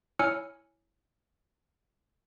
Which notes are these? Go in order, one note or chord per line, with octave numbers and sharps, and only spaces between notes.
E4 C#5 G#5 E6 F6 C#7